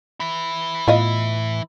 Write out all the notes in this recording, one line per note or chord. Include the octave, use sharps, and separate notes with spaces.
E3 E4
A2 B3 F4 D#5